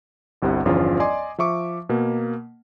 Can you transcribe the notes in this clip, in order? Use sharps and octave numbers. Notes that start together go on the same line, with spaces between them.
G1 C2 C3 E4 F#5
G1 E2 F3 C#4 F4
D5 D#5 G#5 C6 D6
F3 E5 C#6 D6
B2 A#3